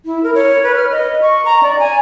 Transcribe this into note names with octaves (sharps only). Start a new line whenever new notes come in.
E4
A#4
C#5
B4
F6
D#5
C#6
A#5
D5
G#5